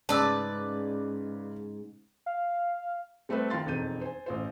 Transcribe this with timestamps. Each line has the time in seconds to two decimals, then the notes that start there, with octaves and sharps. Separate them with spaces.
0.09 G#2 C#3 B4 D5 A5 E6
2.26 F5
3.29 G3 A3 C4 A4 B4 C5
3.50 D#3 F3 F5 C6 A6
3.66 E1 F2 D#4 G6 D#7
4.01 C5 G#5
4.26 A1 F4 C5